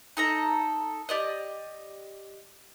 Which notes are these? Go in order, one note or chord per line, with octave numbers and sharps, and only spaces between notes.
D#4 A4 A#5
G4 D5 D#5